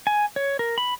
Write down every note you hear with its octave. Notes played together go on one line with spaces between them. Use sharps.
G#5
C#5
A#4
B5